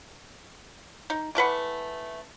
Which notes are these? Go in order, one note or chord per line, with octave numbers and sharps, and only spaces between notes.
D#4
E3 A3 B4 F#5